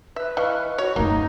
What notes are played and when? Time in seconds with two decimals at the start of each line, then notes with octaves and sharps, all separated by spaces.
0.16 B4 E5
0.37 E3 E4 D#5 F5 C#6
0.78 F#4 C#5
0.96 F#2 A3 A#3 D#4